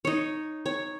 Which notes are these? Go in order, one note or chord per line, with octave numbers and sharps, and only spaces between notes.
D#4 C#5
C#5